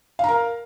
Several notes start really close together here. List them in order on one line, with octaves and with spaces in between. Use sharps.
F5 A#5 A#4